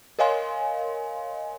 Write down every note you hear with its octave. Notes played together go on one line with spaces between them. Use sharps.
A#4 C#5 D#5 F5 G#5 C6